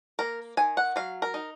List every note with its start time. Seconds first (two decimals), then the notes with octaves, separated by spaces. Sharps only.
0.19 A#3 A#4
0.57 D#3 G#5
0.77 F#5
0.96 F#3 F5
1.22 A#4
1.34 D#4